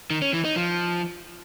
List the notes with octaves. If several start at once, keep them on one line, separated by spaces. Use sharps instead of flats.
D#3
C#4
E3
D#4
F3